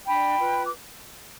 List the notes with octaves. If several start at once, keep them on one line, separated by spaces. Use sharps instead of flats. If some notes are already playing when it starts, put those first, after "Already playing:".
D4 G5 B5
F4 B4
D6